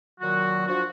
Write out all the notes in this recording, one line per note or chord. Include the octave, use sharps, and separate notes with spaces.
A#2 D#3 F#3 F#4
F3 D4 F#4